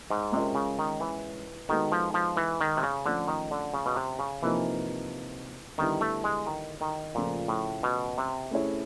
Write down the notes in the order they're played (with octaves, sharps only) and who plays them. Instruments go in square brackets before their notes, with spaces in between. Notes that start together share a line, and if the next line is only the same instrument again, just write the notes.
[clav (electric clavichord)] G#2
[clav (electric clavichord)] C3 [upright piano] G#3 C#4 F4 A#4 D#5
[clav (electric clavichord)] C#3
D#3
E3
[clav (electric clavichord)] D#3 [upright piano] G#3 B3 D#4 F#4 A4
[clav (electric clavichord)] F3
F3
E3
D#3
C3
C#3
[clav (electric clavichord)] D3 [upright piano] F3 A3 C#4
[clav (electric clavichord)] D#3
D3
C#3
B2
C3
C#3
[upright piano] C3 F3 A#3 D#4 [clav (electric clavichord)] E3
[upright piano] D3 G3 B3 E4 G4 [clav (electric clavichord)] D#3
[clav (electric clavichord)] A3
G#3
D#3
D#3
[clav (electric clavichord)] A#2 [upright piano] C#3 F3 A3
[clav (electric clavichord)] A2
B2
C3
[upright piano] A3 C#4 E4 G#4 C#5